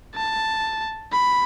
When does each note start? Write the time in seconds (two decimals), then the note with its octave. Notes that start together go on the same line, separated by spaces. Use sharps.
0.15 A5
1.12 B5